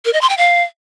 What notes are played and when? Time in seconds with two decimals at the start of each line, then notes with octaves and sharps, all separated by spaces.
0.05 A#4
0.13 D#5
0.21 C6
0.29 G5
0.38 F5